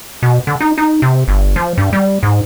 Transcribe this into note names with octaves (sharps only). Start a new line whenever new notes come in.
B2
D3
D#4
D#4
C3
G1
F3
G2
G3
G#2